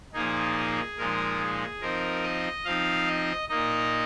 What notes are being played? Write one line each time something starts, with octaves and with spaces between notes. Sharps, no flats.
A#2 F3 A#3 D#4 G#4
A#2 F3 G#3 D#4 A#4
G#4
F3 C4 D#4 A#4
D#5
F3 C4 D#4 F5
D#5
A#2 A#3 D#4 D#5